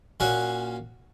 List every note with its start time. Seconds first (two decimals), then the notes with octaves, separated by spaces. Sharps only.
0.20 A#2 A#3 C#4 F#4